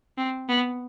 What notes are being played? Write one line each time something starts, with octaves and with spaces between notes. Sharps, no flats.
C4
B3